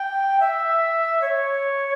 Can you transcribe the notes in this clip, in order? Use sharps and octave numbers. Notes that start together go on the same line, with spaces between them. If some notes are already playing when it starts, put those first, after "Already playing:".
Already playing: G5
E5
C#5